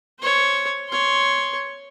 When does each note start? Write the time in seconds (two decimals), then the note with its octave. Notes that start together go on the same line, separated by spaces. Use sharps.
0.20 C5 C#5
0.89 C#5 C6